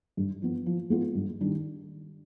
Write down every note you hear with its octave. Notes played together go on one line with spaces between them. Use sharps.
G2
F3 B3
F3
G#3 B3 F4
G2
D#3 G3 D4